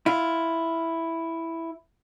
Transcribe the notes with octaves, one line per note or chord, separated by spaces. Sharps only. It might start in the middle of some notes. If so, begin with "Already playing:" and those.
E4 F4